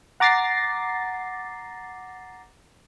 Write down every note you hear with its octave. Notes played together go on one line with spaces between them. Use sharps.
F#5 A#5 D6 A6 A#6 C7